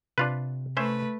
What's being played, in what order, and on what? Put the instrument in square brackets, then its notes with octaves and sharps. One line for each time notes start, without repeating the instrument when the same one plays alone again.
[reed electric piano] C3 [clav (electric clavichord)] D4 F4 B4
[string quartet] A3 B4 [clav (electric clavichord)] C#4 C5 E5